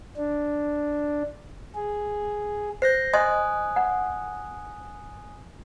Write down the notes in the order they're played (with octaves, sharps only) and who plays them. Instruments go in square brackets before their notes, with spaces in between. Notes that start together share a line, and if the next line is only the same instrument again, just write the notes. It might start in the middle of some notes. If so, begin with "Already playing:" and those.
[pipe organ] D4
G#4
[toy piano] C5 [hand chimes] G6 A#6 C7
[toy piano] D#5 C6 [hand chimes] G#5 D#6 F#6
[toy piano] F#5